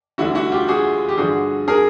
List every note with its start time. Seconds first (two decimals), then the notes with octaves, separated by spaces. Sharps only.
0.18 D2 D3 G3 E4 F#4
0.35 E4 F#4
0.52 F4 G4
0.68 F#4 G#4
1.09 G4
1.18 G2 D3 F3 F#4 G#4
1.68 G#4 A#4